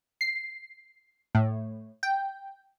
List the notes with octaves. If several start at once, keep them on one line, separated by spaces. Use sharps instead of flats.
C7
A2
G5